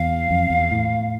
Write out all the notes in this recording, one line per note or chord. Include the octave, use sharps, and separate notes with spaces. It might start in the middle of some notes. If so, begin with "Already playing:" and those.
Already playing: E2 F5
F2
E2
A2